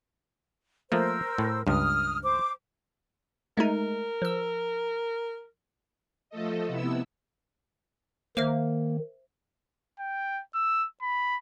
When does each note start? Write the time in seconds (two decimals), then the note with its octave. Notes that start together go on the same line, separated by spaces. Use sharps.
0.92 F3 A3 A#3 A#4 C5 E6
1.38 A2
1.67 C#2 G2 D#6 F6
2.23 C5 D6
3.57 G#3 A3 D#4 A#4
4.22 F3 E6
6.30 F3 A3 A4 D#5
6.67 C3 B3 E4 E6
8.37 D#3 A#3 C5 E5 F6
9.99 G5
10.55 E6
11.02 B5